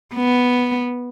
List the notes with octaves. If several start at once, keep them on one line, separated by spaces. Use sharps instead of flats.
B3